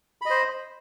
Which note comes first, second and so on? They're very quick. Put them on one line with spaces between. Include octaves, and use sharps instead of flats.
B5 D#5 C5